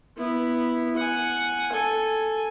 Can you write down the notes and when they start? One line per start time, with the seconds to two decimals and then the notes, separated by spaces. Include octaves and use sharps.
0.17 B3 E4
0.97 F#5 G#5
1.72 A4 G#5